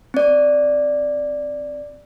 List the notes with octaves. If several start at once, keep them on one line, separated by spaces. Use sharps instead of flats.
C4 D5